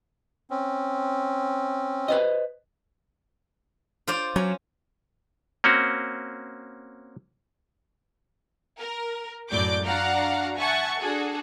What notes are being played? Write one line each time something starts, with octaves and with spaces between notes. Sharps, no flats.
C4 C#4
B4 C5 D#5
F4 C5 D5
F#3 C#4
A#3 C4 C#4 F#4
A#4
F#2 A2 F#3 D5 D6 G6
D4 F#4 D5 F5 F#5 A#5
E5 F#5 G#5 A5 C#6
D4 F#4 G#4 A4